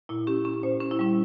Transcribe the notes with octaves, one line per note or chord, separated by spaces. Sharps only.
A#2 E4
C#4 G4
C#4
A#2 C5
C#4
E4
G3 C#4